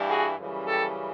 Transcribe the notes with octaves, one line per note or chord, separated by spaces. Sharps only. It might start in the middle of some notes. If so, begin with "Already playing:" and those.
Already playing: G2 E3 G3
F#4 G#4
F#2 C#3 E3 G3
G4 A4